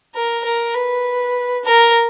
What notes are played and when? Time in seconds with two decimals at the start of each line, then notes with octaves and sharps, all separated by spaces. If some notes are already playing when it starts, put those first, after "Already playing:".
0.14 A#4
0.44 A#4
0.74 B4
1.65 A#4